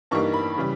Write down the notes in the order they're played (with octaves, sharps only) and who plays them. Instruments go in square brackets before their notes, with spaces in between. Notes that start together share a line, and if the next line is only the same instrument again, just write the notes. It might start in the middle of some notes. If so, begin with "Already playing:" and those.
[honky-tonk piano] G2 E3 G3 A#3 D#4 C#6
B5
C#3 E3 G3